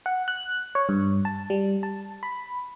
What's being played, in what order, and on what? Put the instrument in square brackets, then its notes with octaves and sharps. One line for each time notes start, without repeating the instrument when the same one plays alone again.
[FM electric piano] F#5
F#6
C#5
G2
A5
G3
A5
B5